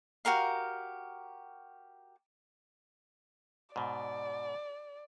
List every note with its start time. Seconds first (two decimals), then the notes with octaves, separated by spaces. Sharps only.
0.25 F#4 G4 A#4 F5
3.76 G#2 B2 D5